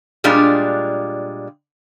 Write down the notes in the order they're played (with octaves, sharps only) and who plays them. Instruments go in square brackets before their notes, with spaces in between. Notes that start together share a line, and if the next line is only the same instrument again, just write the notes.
[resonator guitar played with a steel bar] A#2 G3 G#3 D4 F4